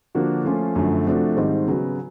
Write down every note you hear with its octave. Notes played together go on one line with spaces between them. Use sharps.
D3 F3 A#3 D4 F#4
F3 A3 C#4 F4
F#2 D3 F3 A3
C3 F3 A3 D4 F#4
G#2 D#3 G3 C4
C#3 F#3 B3